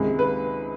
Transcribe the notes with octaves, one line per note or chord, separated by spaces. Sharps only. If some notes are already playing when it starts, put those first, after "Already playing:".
Already playing: C#2 C3 D#3 G#3
B4